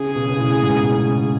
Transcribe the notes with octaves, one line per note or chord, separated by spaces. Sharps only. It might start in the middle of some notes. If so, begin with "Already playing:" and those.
Already playing: C#3 G#4
B2
C#3
B2
A2
G#2
A2
B2
C#3